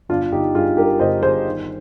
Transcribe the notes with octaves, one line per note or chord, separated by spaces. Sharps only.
G1 D4 F4
G1 D#4 G4
G2 F4 G#4
G2 G4 A#4
G1 C5 D#5
G1 G#4 C5
D#3